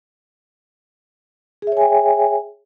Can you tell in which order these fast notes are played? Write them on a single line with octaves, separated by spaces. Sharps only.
G#4 E5 C#5 G#5 G5